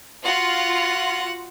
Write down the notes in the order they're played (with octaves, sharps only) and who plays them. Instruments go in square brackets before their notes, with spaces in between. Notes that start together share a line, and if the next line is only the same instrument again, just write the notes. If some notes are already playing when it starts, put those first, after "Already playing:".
[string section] F4 [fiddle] F#4 F#5